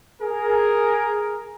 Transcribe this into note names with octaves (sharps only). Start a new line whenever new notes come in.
G#4 A#4